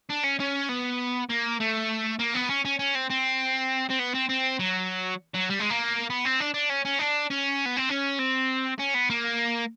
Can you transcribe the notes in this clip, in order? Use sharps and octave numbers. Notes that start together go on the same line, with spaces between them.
D4
C#4
C#4
B3
A#3
A3
A#3
B3
C#4
C#4
C#4
C4
C4
C4
B3
C4
C4
F#3
F#3
G3
G#3
A#3
B3
C4
D4
D4
C#4
C#4
D4
C#4
B3
C4
C#4
C4
C#4
B3
A#3